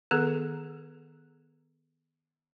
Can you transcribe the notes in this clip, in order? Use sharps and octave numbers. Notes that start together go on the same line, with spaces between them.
D#3 B3 G#4 A4